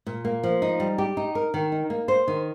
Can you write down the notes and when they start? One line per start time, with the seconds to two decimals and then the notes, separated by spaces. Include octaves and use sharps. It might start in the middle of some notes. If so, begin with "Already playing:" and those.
0.07 A#2
0.25 A#3
0.43 F3
0.62 D#4
0.80 G3
0.98 G4
1.17 D#4
1.35 A#4
1.54 D#3
1.72 D#4
1.90 A#3
2.08 C5
2.28 D#3